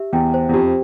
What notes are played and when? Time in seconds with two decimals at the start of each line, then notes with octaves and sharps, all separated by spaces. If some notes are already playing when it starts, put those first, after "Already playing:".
Already playing: G4 E5
0.13 E2 G5
0.34 C5
0.49 E2
0.54 F2 G4